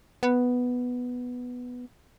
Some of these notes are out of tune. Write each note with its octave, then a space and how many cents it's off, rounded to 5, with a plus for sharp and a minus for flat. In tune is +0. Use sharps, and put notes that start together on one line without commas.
B3 +0